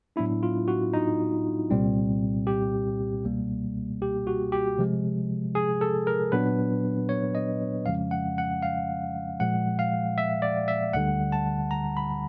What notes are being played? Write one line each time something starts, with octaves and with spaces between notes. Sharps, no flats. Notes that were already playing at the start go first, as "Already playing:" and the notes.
A2 F#3 B3 D4 E4
F4
F#4
D#4
C2 A#2 G3 C4
G4
C#2 B2 G3 A#3
G4
F#4
G4
C3 F3 G#3
G#4
A4
A#4
A#2 F#3 B3 D4 B4
C#5
D#5
F2 C#3 F3 G#3 C#4 F5
F#5
F#5
F5
A#2 F3 G#3 F#5
F5
E5
D5
E5
D2 D3 G3 F#5
A5
A#5
B5